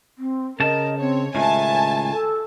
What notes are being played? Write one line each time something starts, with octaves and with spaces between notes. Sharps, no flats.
C4
C#3 A#4 D#5 A5
C4 C#5
C#2 A2 D#3 E5 G#5 A5
A4